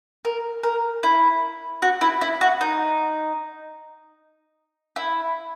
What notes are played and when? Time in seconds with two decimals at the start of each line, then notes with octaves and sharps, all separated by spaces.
0.25 A#4
0.63 A#4
1.03 E4
1.82 F#4
2.01 E4
2.21 E4
2.41 F#4
2.61 D#4
4.96 E4